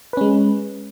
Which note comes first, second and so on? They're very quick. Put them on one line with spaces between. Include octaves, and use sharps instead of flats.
B4 C#4 G#3